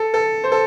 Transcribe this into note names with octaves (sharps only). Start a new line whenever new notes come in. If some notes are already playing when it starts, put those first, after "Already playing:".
Already playing: A4
A4
C5
A4